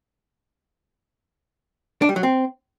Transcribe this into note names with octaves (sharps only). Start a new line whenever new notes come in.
D4
G3
F#3
C4